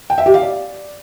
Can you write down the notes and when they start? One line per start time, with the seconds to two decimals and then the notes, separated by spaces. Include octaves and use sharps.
0.10 G5
0.18 E5
0.26 G4
0.34 F5
0.42 D5